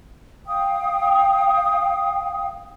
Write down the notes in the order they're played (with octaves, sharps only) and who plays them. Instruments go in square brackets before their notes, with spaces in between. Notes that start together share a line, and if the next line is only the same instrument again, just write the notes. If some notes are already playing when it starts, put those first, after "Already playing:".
[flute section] F5 G5 D#6